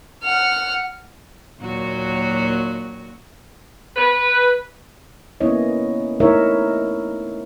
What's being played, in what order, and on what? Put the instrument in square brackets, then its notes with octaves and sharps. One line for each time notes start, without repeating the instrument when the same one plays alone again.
[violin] F#5 F6
[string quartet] D#2 A#2 F#3 F#4
[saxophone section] B4
[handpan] A#3 B3 C#4 E4 C#5 D#5
A3 D#4 E4 A#4 C#5 E5